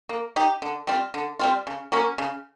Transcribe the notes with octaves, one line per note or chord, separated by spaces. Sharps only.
A#3
D#4 G4
D3
G3 C4 F4
D3
G3 C4 F4
C#3
F#3 A#3 C#4
C#3